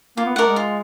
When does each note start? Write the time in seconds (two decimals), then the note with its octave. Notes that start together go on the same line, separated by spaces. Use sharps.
0.17 A#3 F4
0.26 B3
0.36 A3 A#4 D5 F#5
0.47 G#3
0.56 F4